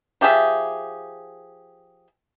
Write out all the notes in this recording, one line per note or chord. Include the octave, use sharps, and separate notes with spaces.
F3 G4 G#4 E5